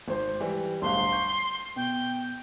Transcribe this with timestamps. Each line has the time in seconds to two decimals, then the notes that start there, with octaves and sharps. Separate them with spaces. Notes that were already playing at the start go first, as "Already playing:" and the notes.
0.08 G#1 C5
0.40 E3 G3
0.82 D1 G1 F5 C6
1.12 C#6 G6
1.76 B2 G5